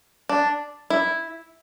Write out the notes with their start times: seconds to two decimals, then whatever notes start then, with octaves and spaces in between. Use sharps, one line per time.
0.29 D4
0.90 E4